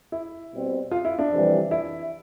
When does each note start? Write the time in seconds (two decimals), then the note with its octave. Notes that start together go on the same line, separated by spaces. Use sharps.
0.12 E4
0.52 B2 G3 C4
0.91 F4
1.05 E4
1.19 D4
1.32 F2 C3 E3 G3
1.71 E4